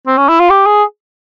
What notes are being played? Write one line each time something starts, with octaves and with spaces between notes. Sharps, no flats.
C4
C#4
E4
F4
G4
G#4